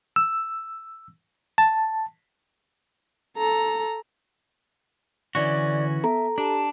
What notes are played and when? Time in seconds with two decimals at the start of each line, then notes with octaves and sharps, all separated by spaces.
0.16 E6
1.58 A5
3.38 A4 A#5
5.35 D3 E3 C#4 F#4 D5
6.04 B3 A4 E5 A#5
6.38 D4 G4 A5